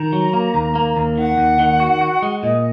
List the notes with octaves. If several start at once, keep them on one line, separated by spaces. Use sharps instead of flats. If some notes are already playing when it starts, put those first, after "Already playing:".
Already playing: D#3 A#5
F#3
A#3
D#2
A#3
D#2
D#3 F#5
D#2
D#3
F#4
F#4
G#3
A#2 D#5